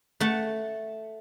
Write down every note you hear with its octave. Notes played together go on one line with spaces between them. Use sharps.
A3 F#5 A5